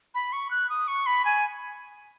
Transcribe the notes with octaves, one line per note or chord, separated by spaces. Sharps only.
B5
C#6
F#6
D#6
C#6
B5
G#5